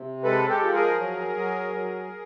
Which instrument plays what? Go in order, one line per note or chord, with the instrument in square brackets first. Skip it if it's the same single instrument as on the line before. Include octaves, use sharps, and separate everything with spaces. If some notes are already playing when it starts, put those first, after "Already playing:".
Already playing: [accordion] C3
G#3 A4 B4
G4 A4
F3
G#4 A#4
F#3
F#3
F#3